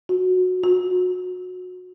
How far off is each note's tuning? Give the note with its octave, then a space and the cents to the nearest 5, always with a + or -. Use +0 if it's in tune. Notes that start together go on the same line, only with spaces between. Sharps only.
F#4 -15
F#4 -25